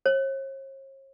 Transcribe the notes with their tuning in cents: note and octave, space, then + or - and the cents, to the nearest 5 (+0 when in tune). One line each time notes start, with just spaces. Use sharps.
C#5 -45